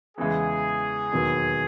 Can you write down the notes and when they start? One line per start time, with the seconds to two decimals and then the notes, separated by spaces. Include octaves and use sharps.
0.18 E2 C#3 E3 G#3 G#4
1.12 E1 D#2 D#3 F#3 B3